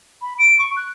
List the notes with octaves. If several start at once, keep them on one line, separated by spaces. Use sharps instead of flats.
B5
D7
C#6
F#6